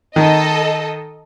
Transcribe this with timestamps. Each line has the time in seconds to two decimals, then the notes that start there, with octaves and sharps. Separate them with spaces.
0.16 D#3 A4 D#5